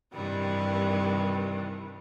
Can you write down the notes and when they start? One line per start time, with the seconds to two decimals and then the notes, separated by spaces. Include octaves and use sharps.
0.13 G2 C3 D#3 E3 G3